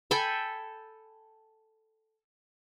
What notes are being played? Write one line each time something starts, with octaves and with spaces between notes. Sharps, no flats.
A4 G5 G#5 B5